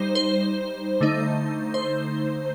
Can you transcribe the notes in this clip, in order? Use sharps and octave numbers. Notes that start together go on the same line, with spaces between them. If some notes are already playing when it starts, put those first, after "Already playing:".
Already playing: G3 D#4 C5
C5
D3 A3 D#4
C5